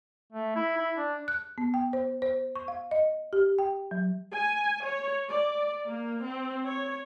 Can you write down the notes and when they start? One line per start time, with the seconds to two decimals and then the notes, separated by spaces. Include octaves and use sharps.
0.32 A3
0.56 E4
0.77 E4
0.96 D4
1.28 F#6
1.58 B3
1.74 G5
1.93 C5
2.22 C5
2.56 C#6
2.68 F5
2.91 D#5
3.33 G4
3.59 G5
3.91 F#3
4.34 G#5
4.87 C#5
5.28 D5
5.89 A#3
6.25 C4
6.67 C#5